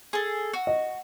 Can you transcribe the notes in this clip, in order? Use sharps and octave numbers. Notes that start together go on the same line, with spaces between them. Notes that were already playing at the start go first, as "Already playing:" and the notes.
G#4 A4
F#4
D#5